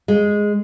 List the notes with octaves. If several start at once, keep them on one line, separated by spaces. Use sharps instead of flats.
G#3